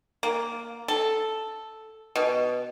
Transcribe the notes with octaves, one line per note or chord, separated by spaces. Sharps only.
A#3
A4
B2